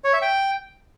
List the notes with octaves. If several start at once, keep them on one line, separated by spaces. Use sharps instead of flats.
C#5
E5
G5